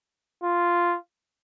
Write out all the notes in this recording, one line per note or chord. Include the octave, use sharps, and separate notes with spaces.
F4